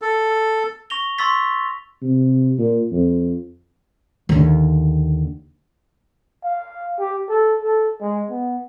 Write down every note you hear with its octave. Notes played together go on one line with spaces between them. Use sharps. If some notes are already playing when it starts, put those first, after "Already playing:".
A4
C#6 A#6 F7 G7
C6 C#6 E6 A6 B6
C3
A#2
F2
D#2 D3
F5
G4
A4
A4
G#3
B3